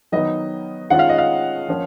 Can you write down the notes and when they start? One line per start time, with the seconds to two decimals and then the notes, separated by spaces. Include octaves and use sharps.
0.12 D#3 F#3 B3 D#4 D#5
0.90 D#3 G#3 C#4 F4 F#5
0.99 F5
1.09 D#5
1.18 F5
1.68 F3 A#3 C#4